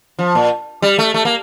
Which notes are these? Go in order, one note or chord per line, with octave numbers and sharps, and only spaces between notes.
F3
A#2
G3
A3
A3
A#3